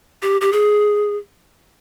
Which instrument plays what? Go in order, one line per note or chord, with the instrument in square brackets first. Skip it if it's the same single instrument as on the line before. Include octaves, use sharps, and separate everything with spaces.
[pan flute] G4
G4
G#4